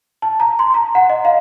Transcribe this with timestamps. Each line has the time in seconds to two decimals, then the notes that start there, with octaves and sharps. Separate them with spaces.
0.22 A5
0.40 A#5
0.59 C6
0.74 A#5
0.95 F#5
1.10 D#5
1.25 F5